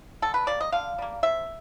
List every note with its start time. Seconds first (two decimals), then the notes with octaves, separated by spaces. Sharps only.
0.22 D3 A4
0.34 B4
0.47 G3 A#3 D5
0.60 D#5
0.72 D3 F5
0.98 G3 A#3
1.23 C3 E5